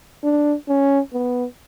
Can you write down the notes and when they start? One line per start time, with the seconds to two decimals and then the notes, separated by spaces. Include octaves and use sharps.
0.23 D4
0.69 C#4
1.13 B3